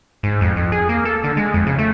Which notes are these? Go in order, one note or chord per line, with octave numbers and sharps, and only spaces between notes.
G#2
F2
F2
G#4
A#3
A4
D3
G#3
F2
C#3
A3